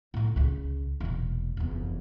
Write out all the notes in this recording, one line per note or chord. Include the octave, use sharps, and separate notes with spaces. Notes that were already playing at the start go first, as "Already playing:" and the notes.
A2 D#4
C#2 C#3
E1 A#2
F1 E2